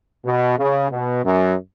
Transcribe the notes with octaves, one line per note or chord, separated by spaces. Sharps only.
B2
C#3
B2
F#2